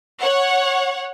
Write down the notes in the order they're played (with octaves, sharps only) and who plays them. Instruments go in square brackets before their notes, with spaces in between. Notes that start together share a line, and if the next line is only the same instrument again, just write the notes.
[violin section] C#5 F#5